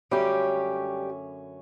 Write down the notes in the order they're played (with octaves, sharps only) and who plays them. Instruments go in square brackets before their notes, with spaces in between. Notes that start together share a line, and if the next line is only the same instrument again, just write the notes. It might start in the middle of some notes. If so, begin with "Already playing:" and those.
[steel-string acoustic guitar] F#2 D3 G3 A3 C#4 G4